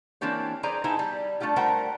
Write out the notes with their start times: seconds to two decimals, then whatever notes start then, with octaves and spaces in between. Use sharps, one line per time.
0.21 E3 A#3 C4 D4 G4 C#5
0.63 G#4 B4 C5 D5 A#5
0.84 B3 D#4 E4 C5 G#5 A5
0.99 G3
1.40 G3 A3 D4 F4 G4
1.56 G3 A3 A#4 C5 F#5 G5